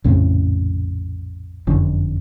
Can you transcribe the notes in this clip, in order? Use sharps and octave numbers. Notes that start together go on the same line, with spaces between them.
A#1 F2 A2 C#3
F#1 F2 D3